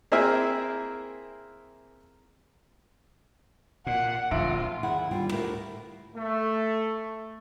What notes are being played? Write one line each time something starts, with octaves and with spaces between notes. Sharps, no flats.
A#3 C4 E4 G#4 A#4 E5
A#2 F#5
D1 A#1 F3 F4 E5 D7
D#2 E4 G#4 F#5
D#2 D3 G3 F4 G5
D2 A2 E4 F4 G4 A#4
A3